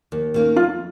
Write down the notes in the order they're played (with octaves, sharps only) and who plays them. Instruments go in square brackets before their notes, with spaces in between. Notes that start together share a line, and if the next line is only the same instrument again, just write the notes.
[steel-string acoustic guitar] D#2
D#3 A#3 C#4
[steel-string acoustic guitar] F2 [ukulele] F4